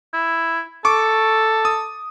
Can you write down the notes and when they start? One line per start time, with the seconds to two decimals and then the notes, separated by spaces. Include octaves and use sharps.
0.14 E4
0.85 A4 C#6 D6
1.65 D#6